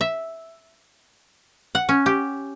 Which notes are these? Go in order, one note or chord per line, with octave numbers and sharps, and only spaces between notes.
E5
F#5
C#4
G4